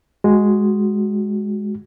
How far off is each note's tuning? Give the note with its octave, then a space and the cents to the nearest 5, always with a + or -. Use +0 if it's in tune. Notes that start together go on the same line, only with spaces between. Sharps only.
G#3 +0 F#4 +0